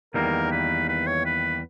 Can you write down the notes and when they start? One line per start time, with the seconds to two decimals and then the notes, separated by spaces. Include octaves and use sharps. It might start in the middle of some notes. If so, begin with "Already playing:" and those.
0.14 E2 D#3 G3 A#3 A#4
0.52 B4
0.89 B4
1.07 C#5
1.26 B4